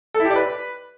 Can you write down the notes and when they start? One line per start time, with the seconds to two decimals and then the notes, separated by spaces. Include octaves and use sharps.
0.14 A4
0.20 E4
0.25 G4
0.30 D5
0.36 B4